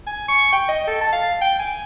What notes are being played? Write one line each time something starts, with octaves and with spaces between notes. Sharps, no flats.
G#5
C#6
G5
D#5
A4
A5
F5
G5
G#5